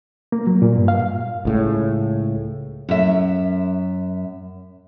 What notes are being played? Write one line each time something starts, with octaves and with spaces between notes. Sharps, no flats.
A#3
F#3
A#2
G2
F5
C#2 A2 C#3
F#2 E5